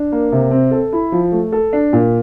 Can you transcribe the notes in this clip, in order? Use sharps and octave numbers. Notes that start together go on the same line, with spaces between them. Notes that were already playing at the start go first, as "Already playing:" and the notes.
Already playing: D4
A#3
C3
C4
A4
E4
F3
A3
A4
D4
A#2